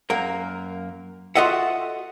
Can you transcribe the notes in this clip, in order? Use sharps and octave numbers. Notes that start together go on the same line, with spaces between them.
F#2 A#3 A#4
F4 F#4 A4 D#5 E5 F#5